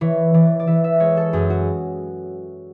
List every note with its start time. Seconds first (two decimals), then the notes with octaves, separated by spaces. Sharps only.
0.01 E3 C#5
0.34 E3 D5
0.60 D5
0.67 E3 E5
0.84 E5
1.00 G#3 C#5
1.17 A4
1.33 F#2 G#4
1.50 F#4